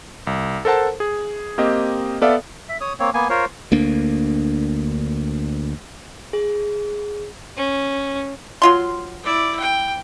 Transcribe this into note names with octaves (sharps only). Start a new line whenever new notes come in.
C2
A4 A#4 C5 F#5 A5
G#4
A#3 C4 G4 D#5
B3 A4 D5 E5 F5
E5
C#5 D#6
A#3 C4 C#5
A#3 B3 G#5
F4 A#4 C5 C#5
D2 A#3 D4
G#4
C#4
F#3 F4 C6
E4 D5
G5